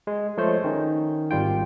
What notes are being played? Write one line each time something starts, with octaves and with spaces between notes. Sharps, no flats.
G#3
F3 G#3 A3 C5 C#5
D#3 C#4 D#4
G#1 G3 F4 G5